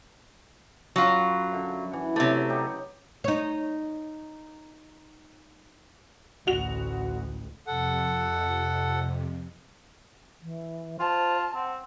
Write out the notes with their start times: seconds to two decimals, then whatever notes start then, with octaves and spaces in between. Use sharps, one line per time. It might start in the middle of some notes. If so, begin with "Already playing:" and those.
0.96 F#2 F#3 F4 B5
1.52 D3 E5
1.91 E3 F#5
2.16 C3 A3 D4 C#5
2.32 F#3
2.50 D#4 G4 F#5
3.24 D#4 C#5
6.47 A1 D2 F#4 F7
7.67 F2 C3 A4 F#5
10.43 E3
11.00 F4 C5 A5
11.55 C4 F#5